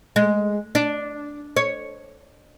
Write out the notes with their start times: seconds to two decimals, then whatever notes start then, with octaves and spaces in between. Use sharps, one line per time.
0.16 G#3
0.75 D4
1.56 C#5